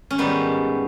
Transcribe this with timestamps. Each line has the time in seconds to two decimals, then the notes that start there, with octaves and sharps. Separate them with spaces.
0.11 C#4
0.18 G#2 D#3 G3 B3